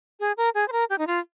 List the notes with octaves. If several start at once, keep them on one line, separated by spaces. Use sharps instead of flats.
G#4
A#4
G#4
C5
A#4
G4
D#4
F4